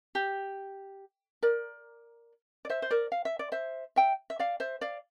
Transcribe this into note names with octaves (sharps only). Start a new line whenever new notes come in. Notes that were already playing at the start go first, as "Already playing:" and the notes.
G4
A#4 D5
D5
C5 E5
C5
A#4 D5
F5
E5
D5
C5 E5
E5 G5
E5
D5 F5
C5 E5
D5 F5